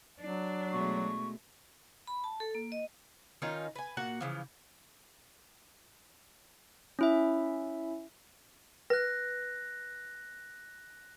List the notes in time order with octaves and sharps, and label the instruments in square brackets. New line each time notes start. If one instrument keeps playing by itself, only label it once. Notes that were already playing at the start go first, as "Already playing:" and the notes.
[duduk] F#3 [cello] D4
[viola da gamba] B2 G#3 A3 [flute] C#6
[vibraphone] B5
A5
A4
A#3
D#5
[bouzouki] D#3 C#4 D#4 F4
B4 G#5
A#2 A#3 F#4 F#5
C#3 E3 F3
[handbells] C#4 E4 E5
[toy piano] B4 [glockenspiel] F#6 A#6